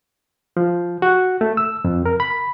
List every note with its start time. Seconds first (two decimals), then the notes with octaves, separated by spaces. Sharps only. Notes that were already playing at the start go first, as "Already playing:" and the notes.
0.57 F3
1.02 F#4
1.41 A3
1.57 E6
1.84 F2
2.06 A#4
2.20 B5